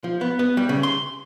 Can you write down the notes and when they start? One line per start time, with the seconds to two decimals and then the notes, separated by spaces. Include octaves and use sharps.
0.04 F3
0.21 B3
0.39 B3
0.57 G3
0.69 C#3
0.83 C6